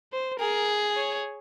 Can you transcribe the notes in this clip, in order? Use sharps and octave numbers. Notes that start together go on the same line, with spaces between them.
C5
G#4 A#4
C#5